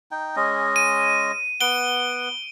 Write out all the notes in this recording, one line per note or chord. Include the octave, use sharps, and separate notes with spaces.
D#4 G5
G#3 C#4 D#5
D#7
B3 F#5 D7 G7